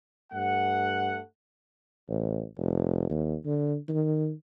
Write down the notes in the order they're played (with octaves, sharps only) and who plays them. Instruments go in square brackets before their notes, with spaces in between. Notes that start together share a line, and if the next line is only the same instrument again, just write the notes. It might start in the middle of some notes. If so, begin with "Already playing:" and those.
[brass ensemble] G2 A3 F#5
[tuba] A1
F1
D#2
D3
D#3